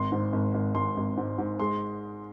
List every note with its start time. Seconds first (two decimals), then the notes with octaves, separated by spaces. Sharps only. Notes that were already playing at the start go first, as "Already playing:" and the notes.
Already playing: G#1 C6
0.12 G#2
0.33 G#1
0.54 G#1
0.74 G#1 C6
0.97 G#1
1.17 G#2
1.38 G#2
1.59 G#3 C6